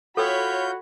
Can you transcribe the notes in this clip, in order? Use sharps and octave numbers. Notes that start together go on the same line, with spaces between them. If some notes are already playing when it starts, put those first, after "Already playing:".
F4 F#4 A4 C#5 G5 B5 E6 G6